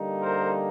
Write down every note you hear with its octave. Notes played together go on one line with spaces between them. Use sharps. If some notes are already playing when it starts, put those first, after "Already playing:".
Already playing: D3 G3 A#3 D#4
A#4 C5